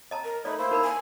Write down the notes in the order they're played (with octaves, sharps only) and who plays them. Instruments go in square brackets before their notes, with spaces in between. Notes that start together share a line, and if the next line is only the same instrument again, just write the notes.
[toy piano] D#5 A5 A#5
[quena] A#4
[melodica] A3 D#4 [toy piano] D5 [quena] B5
[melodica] A#3 E4 [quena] C5
[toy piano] D#4 A#4 B5
[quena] G#5